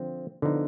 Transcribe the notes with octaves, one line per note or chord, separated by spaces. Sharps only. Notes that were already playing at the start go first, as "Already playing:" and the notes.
Already playing: D3 F3 C4
D3 F3 B3 D#4